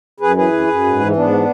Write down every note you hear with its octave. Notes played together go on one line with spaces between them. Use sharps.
F#2 G#4 B4
E3 G#4 B4
F#2
F#2
G#2
E3
G#2 B3 D4
E3